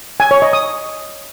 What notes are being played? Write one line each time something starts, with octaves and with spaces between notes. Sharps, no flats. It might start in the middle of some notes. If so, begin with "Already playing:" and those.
G#5
C#5
D#5
D#6